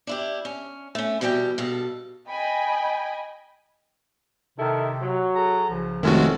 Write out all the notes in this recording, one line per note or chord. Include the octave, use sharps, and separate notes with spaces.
D4 E4 G4
C#4
A3 C#4
B2 E3 G3 C4 G4 G5
G2 B2 A4
D#5 G5 G#5 B5
C3 D#3 E4 A4
F#3
G#4 A4 A#5
C2 C#3 F3
F1 D#3 G#3 A3 C#4 F#4 A4